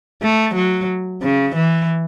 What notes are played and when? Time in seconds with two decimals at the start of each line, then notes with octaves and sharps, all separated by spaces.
0.22 A3
0.55 F#3
1.22 C#3
1.56 E3